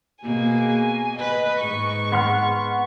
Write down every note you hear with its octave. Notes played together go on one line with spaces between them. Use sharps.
B2 A#3 G#4 G#5
B4 D#5
G#2 C#6
B3 C6 F6